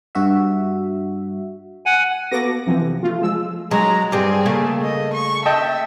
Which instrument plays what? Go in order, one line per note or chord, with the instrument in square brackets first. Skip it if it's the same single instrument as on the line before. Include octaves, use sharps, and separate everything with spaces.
[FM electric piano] G2 F#4 E5
[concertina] F#5 G#5
[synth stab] A#3 B3 F#4 A4 D6 A#6
F2 C3 E3 F3
A3 F4
F3 G#3 E6
[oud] F#3 [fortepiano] G#3 [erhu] A#5
[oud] G2 C4 [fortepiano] G4 [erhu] G#4
[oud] C#3 A3 A#3
[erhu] D#5
C#6
[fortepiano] D#5 G5 A5 [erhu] E5